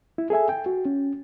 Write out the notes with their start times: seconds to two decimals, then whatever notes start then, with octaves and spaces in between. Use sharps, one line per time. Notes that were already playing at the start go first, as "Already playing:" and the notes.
0.18 E4
0.30 G#4 A4 E5 G#5
0.49 G5
0.66 F#4
0.85 C#4